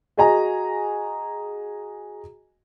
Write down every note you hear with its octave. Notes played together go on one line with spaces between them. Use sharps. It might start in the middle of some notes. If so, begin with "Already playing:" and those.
F#4 G#4 D#5 G#5 A#5